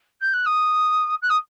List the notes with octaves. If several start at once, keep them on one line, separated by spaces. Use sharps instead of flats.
G6
F#6
D#6
F#6
D#6